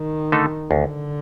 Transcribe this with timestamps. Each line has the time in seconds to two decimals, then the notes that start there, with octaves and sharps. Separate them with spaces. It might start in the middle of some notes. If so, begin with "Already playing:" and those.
Already playing: D#3
0.32 D3 A3 D#4 A4
0.71 D2 D3